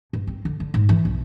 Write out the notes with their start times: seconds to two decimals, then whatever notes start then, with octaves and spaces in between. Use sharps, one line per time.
0.13 G2
0.27 C4
0.45 D3
0.60 D3
0.74 G#2
0.89 E3
1.05 B1